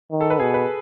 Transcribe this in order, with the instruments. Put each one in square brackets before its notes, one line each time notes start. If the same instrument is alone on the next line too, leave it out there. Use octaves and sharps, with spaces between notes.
[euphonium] D#3
[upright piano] A4
B4
[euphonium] B2 [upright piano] G#4
[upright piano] B4